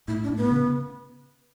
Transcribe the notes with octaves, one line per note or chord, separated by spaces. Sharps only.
A2 E4
D4
A2
B3
C#3